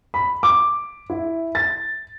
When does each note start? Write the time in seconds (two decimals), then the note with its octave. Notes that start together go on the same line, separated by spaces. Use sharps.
0.14 B5
0.43 D6
1.10 E4
1.55 A6